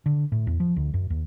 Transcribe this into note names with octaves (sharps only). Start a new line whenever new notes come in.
D3
A2
E2
F3
D2
F#2
D#2